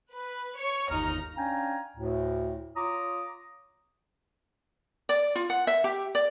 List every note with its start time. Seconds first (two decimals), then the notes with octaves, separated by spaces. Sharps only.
0.13 B4
0.58 C#5 C#6
0.90 G1 D#2 D#4 A#5 F6
1.36 C#4 D4 F5 G5 G#5 A#5
1.97 D2 A2
2.77 F4 C#5 A#5 D6 D#6
5.09 D5
5.35 F4
5.50 F#5
5.67 E5
5.84 G4
6.15 D5